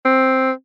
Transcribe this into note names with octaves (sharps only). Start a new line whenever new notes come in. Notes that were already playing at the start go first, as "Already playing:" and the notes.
C4